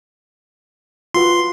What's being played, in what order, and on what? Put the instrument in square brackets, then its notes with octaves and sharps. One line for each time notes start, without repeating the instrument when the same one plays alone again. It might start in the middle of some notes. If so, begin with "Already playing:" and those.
[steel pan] F4 F#4 B4 [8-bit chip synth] C6